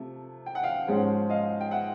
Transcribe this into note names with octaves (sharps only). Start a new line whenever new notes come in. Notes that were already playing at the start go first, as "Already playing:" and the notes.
Already playing: C3 F3 A3
G5
F#5
F5 G5
G#2 F3 G#3 C#4
D#5 F5
G5
E5 F#5